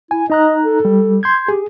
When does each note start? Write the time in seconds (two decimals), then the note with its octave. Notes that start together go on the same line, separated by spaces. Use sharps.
0.11 E4 G#5
0.30 D#4 D#5 A#5 F#6
0.63 A4
0.85 G3
1.23 C6 G6 G#6
1.48 G4 G#4